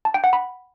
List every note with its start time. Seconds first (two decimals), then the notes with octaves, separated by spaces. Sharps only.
0.05 A5
0.14 G5
0.24 F#5
0.33 B5